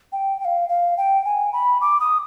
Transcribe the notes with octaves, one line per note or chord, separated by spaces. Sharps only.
G5
G5
F5
F5
G5
G#5
B5
D6
D#6